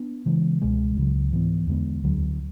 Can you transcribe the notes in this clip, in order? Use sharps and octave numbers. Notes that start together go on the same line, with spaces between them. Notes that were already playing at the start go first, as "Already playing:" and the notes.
Already playing: B3 D4
C#3 E3 G#3
C#2 B2 G#3
C#2 C#3 F#3
G#2 E3 B3
E2 D3 G#3 B3
D2 D3 F#3